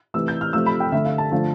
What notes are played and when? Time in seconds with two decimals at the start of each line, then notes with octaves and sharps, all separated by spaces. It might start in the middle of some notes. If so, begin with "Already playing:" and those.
0.14 C3 E3 A3 E6
0.28 G6
0.41 F6
0.53 C3 F3 A3 E6
0.66 B5
0.80 G5
0.92 D3 A3 E5
1.05 F5
1.18 A5
1.31 D3 F3 A3